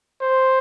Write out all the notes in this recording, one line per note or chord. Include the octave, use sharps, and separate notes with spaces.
C5